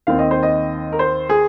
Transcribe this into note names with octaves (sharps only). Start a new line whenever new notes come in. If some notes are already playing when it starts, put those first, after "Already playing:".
D#2 D#3 C4 F5
D#5
C5
D#5
A#4
C5
G#4